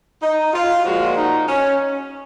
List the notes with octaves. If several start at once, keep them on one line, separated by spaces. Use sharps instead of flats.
D#4
F4
A#2 F3 G#3 F#4
D#4
C#4